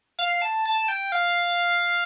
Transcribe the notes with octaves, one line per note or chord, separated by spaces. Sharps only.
F5
A5
A5
G5
F5